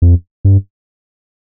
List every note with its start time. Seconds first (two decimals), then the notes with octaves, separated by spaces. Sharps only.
0.02 F2
0.45 G2